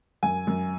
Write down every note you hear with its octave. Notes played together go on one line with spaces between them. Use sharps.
F#2 G#5
F#2